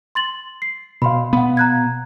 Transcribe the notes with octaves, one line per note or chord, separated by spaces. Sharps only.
C6 A6 F#7
C7
B2 F5 B5 C6
B3 F#5 B5
A#5 F#6 G#6